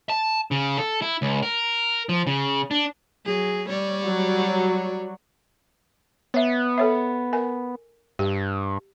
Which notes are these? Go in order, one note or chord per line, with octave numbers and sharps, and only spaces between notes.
A5
C#3
A4
E4
C#2
A#4
F3
C#3
D4
F#3 G#4
G3 C#5 D5
F#3
B3 C#5 E5
A4 C#5 E5
A#4 G#5
G2 G4